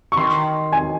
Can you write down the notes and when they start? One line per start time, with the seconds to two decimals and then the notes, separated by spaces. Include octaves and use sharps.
0.12 C#6
0.17 D#3 C6
0.72 G#5